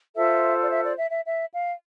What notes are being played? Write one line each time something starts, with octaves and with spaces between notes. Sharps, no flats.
F4 A4 C5 E5
D5
E5
D5
E5
E5
E5
F5